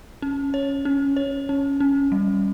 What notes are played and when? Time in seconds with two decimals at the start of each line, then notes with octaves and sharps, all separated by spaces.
0.22 C#4
0.54 C#5
0.85 C#4
1.16 C#5
1.49 C#4
1.80 C#4
2.12 G3